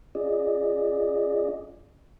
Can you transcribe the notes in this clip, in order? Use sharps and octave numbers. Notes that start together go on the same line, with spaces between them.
C#4 F4 G#4 D5 D#5